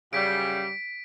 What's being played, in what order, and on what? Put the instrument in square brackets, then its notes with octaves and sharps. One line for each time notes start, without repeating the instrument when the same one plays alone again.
[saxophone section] F#2 C#3 G3 [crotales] B6 D7